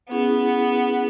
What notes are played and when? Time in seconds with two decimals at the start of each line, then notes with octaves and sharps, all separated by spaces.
0.11 B3 C#4 E4 G#4